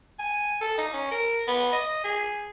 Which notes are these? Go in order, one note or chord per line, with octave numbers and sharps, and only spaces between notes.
G#5
A4
D#4
C#4
A#4
B3
D#5
G#4